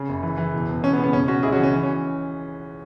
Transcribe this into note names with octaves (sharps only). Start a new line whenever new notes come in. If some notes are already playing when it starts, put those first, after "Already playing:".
Already playing: C#3
F#1
E3
E3
E1
E1
E3 C#4
B3
C#3
B3
E1 C#4
B2 C#4 F#4
C#2 E4 G#4
C#4 F#4
E3
C#4
E3
C#4